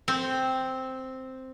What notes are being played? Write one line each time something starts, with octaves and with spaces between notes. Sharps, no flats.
C4